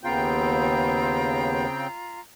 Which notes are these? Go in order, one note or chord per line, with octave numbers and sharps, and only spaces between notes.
D#2 C#3 B3 C4 F4 G5 A#5